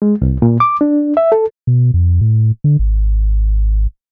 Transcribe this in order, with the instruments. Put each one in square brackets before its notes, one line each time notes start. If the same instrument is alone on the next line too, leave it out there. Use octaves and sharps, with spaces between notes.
[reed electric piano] G#3
C2
A#2
D6
D4
E5
A4
[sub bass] B2
F2
A2
D3
G#1